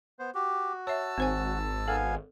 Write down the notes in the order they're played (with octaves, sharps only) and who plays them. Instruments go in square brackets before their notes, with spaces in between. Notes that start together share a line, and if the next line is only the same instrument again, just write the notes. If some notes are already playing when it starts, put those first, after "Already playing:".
[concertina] B3 C5
[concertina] F#4 [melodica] G4
[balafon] C#5 E5 [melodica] A5 E6
[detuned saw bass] G#1 [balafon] C4 C5 G#5
[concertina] B3 F5 G#5 [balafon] A4